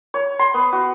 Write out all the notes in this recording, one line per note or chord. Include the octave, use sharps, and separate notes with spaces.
C#5
C6
B3
F#4